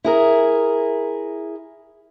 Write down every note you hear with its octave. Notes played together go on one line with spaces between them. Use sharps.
E4 G#4 A#4